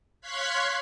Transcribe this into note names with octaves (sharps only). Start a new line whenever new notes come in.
C#5 F5 C6 F#6 G#6 B6